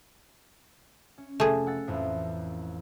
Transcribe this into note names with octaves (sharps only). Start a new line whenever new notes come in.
C#4
F1 A3 G#4 A5
F#5 E6 A6
A1 F2 A2